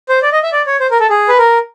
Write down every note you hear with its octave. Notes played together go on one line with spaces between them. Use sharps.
C5
D5
D#5
E5
D5
C#5
C5
A#4
A4
G#4
B4
A#4